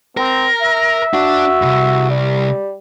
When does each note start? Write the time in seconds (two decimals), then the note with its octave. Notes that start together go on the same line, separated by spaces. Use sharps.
0.17 C4 A#4
0.61 E5
1.14 D4 F#4
1.62 C2 G2
2.10 G3